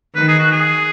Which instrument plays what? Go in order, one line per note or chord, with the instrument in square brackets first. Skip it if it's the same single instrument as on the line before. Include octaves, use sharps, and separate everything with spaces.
[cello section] D#3 [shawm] B4
[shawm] G#4
F#4
G#4